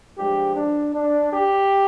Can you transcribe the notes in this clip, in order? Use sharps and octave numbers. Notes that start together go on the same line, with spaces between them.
G2 F3 G#3 G4
D4
D4
G4